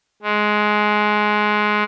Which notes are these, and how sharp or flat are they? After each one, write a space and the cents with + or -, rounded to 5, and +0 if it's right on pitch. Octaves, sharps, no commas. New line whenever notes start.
G#3 +15